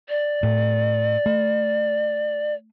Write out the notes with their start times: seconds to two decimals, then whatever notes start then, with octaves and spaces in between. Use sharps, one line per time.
0.09 D5
0.43 A2
1.26 A3